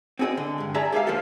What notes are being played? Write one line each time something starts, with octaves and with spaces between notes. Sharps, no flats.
C4 F#4 G#4 B4 D#5
D3
G2 G#3
G#3 G#4 D5 E5 A5 A#5
G4 G#4 C5 E5 F5
D2 F3 A#3 G4 A4 A5